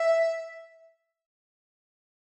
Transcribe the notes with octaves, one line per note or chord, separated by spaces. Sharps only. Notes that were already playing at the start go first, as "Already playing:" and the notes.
Already playing: E5